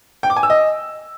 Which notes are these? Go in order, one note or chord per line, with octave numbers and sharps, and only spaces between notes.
G5
D6
G#5
E6
D#5